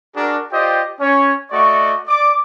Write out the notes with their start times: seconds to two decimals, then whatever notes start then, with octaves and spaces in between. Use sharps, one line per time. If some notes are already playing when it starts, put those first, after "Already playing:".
0.16 D4 F#4 G#4 A#4
0.52 F4 G4 C5 D5 D#5 G5
1.01 C#4 C#5
1.52 A3 F#4 D5 D#5 C#6
2.07 D5 D6